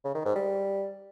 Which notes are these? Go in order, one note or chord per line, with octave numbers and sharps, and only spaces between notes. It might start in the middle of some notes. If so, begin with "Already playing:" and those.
C#3
D#3
G#2
G3